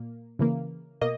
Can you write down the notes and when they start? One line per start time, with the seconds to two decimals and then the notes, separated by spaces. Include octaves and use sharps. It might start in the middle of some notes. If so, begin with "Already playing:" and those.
Already playing: A#2 A#3
0.39 C#3 E3 A#3
1.01 B2 A#3 D#5